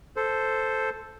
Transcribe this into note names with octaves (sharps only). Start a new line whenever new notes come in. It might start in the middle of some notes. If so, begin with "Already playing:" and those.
A4 C5